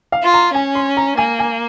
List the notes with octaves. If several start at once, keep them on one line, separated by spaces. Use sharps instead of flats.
F5
F4
A#5
C#4 G#5
C6
A#5
A#3 G#5
G#5